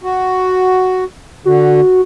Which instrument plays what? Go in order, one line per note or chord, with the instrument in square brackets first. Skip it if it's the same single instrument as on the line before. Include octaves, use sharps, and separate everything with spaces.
[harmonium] F#4
[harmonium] D3 [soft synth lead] F#4